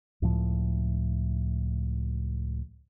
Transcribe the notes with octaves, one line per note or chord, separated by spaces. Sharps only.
C#2 A2 F3